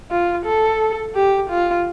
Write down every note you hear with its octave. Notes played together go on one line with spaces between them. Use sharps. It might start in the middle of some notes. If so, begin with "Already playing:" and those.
F4
A4
G4
F4